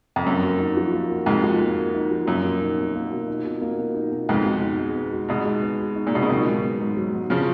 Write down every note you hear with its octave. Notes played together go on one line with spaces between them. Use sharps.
F2
F#2 A#3
F#4
D#4
F3
A#3
F#4
F2 G#2 D#4
F3
A#3
F#4
D#4
F3
F#2 A#3
B2
D#4
B2
A#3
B2
D#4
B2
A#3
B2
D#4
B2
F2 G#2 B3
F#4
D#4
G#3
B3
F#4
G#2 B2 D#4
G#3
B3
F#4
D#4
A#2
B2 G#3
C#3
B2 D#3 F#3
G#2
B3
G#2
F#3
G#2
C#3 F3 B3